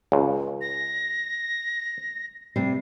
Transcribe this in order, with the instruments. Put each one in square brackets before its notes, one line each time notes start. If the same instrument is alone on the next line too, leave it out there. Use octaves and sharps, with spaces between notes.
[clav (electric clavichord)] C#2
[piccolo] A#6
[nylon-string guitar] C3 G3 [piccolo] C7